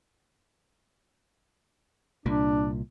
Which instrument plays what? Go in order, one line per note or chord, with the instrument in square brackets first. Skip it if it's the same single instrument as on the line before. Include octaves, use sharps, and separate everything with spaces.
[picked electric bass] C2 A#2 [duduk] D4